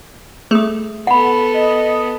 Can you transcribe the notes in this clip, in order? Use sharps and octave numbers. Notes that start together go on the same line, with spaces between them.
A3 G#4 D#6
B3 A4 F#5 B5
D#5